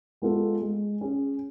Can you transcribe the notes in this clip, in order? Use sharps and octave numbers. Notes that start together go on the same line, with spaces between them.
G#3 B3 F4 A4
G#3
C#4 G#4